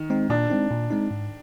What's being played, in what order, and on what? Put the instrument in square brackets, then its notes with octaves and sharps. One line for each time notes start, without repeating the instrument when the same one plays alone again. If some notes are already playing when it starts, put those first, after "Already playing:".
Already playing: [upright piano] D#3
[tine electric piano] G#3 C4 D#4
[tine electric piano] A#2 [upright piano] D4
[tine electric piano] G#3 C4 D#4
A#2
G#3 C4 D#4
G#2